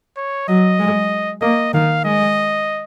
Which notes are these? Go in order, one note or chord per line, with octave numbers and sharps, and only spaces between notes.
C#5
F#3 D#5
G#3
A#3 D#5
D#3 F5
G#3 D#5